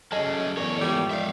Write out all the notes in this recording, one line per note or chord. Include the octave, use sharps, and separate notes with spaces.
F#2 C#4 G#4 A4 D#5 A5
E2 A#4 C#5 D5
G#2 F3 G3
D#3 E5 F5